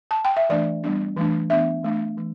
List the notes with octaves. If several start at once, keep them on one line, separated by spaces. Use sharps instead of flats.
A5
G5
E5
E3 A3 D4 D5
G3 B3 D4
E3 A3 D4
E3 B3 D4 E5
E3 A3 D4
E3 A3